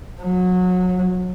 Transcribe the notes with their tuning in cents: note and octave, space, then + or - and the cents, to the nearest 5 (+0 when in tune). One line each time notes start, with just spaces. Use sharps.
F#3 -25